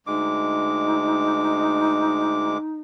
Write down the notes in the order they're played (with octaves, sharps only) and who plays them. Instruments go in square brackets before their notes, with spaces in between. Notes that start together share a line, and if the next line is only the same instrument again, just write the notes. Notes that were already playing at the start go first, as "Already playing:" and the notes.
[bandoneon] D2 G#3 D6 [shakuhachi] D#4